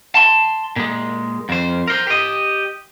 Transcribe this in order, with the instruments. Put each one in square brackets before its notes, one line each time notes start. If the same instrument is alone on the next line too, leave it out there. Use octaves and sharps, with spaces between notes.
[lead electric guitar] A5 C6
A#2 G#3
F2 C5
A#4 C5
G4 D#5